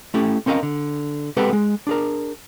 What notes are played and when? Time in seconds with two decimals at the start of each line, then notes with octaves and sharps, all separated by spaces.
0.14 A3 C#4 E4 G4
0.46 C4 C#4 A#4 D#5 F5
0.63 D3
1.37 G#3 B3 C4 G4 A4 B4
1.53 G#3
1.87 D4 G#4 A#4